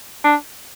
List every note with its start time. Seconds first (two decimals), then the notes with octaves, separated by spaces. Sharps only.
0.24 D4